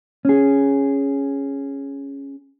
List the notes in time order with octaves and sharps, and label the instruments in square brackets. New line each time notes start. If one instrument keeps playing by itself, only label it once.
[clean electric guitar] C#4 G#4